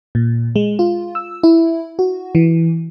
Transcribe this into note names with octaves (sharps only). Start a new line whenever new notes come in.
A#2
G#3
F4
E6
E4
F#4
E3